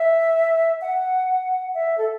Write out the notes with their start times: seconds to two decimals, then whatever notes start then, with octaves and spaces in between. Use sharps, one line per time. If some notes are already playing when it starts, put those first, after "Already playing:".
Already playing: E5
0.81 F#5
1.74 E5
1.98 A4